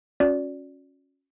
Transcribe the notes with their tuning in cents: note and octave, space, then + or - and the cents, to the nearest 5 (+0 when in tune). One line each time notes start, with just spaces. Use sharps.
C#4 -5 F#4 -35 D5 -15